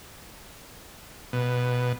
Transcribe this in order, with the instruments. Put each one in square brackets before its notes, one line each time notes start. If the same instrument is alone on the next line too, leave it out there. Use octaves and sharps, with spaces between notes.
[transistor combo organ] B2